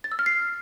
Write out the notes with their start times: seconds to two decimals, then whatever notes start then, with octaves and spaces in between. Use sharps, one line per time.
0.04 A6
0.12 E6
0.19 F6
0.26 C7